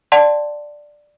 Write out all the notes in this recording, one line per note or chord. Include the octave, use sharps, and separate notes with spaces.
D5 F#5 A5 C6